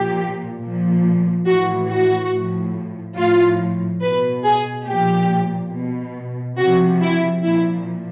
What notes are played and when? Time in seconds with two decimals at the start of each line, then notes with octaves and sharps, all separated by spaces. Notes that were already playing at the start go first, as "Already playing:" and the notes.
Already playing: A#2 F3 G4
0.60 A#2 F3
1.46 A2 E3 F#4
1.89 F#4
2.31 A2 F3
3.16 A2 F3 F4
4.02 B2 B4
4.44 G#4
4.86 A#2 F3 G4
5.72 B2
6.57 C3 F3 F#4
7.01 E4
7.43 A#2 F3 E4